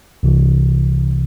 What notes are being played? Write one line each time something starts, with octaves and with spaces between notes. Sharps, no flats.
C2 C3 E3